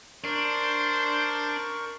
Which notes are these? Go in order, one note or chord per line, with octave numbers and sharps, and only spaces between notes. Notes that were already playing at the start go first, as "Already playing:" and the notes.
D4 A#4 C5 C#6